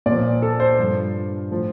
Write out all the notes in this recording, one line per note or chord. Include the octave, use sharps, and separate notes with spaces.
A#2 F3 D5
A4
C5
G2 F3
A2 F3